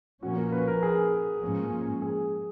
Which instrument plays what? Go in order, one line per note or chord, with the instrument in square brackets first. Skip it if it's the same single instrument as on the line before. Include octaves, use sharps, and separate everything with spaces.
[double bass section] A#2 F3 A#3 C#4 [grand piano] F#4
[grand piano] A#4
B4
A#4
G#4
[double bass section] G#2 F3 A#3 C#4
[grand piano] G#4